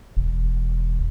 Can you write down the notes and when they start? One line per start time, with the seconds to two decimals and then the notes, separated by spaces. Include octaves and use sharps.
0.17 E1